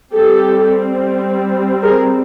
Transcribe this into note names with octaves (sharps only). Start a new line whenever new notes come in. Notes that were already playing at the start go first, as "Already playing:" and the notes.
G3 C4 G4 A4
G#4 A#4